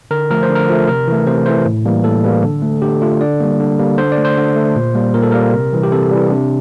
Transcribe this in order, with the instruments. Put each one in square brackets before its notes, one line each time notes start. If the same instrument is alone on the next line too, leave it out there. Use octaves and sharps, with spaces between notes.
[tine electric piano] D3 A#4
F3 A3 A#4
C5
D3
A#4
F3 A3
C3 A#4
E3 A3
C3 C5
E3 A3 C5
A2
E3 G3 A#3
A2 A4
E3 G3 A#3
D3
A3
D3 G4
A3 F4
D3 D5
G3 A#3
D3
G3 A#3
D3 C5
D5
A3
C5
D3
A3
A#2
G3 A#3
A#2 A#4
A4
G3 A#3 A#4
C3
E3 G3
G4
C3 A4
E3 G3
C3 D4